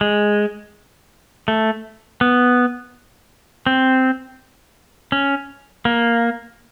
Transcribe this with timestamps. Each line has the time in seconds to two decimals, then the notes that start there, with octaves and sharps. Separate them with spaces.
0.01 G#3
1.48 A3
2.21 B3
3.66 C4
5.12 C#4
5.85 A#3